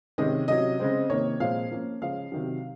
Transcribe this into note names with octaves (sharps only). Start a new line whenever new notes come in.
C3 D#3 G#3 C#4 D#5
C3 F#3 C#4 D#5
C#3 G#3 C4
C3 D#3 A#3 C#5
A#2 F3 G#3 C4 F5
F3 A#3 C#4
C#3 F3 G#3 C#4 F5
C3 D#3 F#3